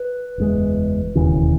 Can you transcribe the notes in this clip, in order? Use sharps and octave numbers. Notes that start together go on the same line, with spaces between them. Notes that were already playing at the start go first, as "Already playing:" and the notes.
Already playing: B4
F#1 E2 B2 G#3
E1 D#2 C#3 E3